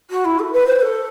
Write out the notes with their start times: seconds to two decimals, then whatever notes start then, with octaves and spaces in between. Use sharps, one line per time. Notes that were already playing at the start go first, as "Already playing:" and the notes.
0.10 F#4
0.25 E4
0.39 A4
0.52 B4
0.67 C5
0.81 A4